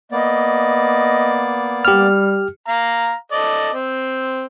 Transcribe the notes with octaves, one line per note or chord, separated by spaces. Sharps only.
A#3 B3 D5 D#5
G3 G4 F6
F5 A#5
A4 D5 D#5
C4